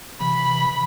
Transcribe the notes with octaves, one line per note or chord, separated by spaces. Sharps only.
C3 E3 B5